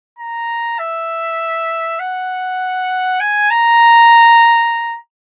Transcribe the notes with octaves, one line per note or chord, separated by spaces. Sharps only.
A#5
E5
F#5
G#5
A#5